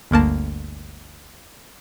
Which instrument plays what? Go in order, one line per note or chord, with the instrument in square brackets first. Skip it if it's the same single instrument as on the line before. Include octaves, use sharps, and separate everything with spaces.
[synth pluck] G1 D2 A#3 A5